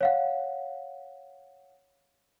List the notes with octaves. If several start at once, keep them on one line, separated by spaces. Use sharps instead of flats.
C#5 F5 F#5